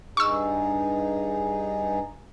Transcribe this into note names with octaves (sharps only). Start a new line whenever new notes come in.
G2 D#4 G#4 C#6 E6